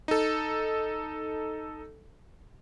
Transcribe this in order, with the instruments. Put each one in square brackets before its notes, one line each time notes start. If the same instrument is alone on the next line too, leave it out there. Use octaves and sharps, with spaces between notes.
[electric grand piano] D#4 A4